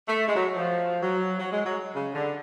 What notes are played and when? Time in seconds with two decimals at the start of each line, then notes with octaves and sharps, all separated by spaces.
0.08 A3
0.26 G#3
0.36 F#3
0.55 F3
1.02 F#3
1.39 F#3
1.51 G#3
1.64 F#3
1.95 C#3
2.14 D3